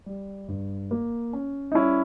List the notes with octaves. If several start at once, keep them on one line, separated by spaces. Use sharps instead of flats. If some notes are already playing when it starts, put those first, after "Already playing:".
G3
G2
A#3
C#4
D#4
G3 C#4 E4